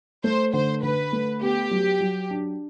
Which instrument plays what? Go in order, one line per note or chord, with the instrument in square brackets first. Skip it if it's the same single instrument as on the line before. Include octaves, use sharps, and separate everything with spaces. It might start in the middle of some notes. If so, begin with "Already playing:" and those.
[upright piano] A3 [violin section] C5
[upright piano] D3 [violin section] C5
[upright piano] D3 [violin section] B4
[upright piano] A3
[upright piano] B3 [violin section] G4
[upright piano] F#3
F#3
D4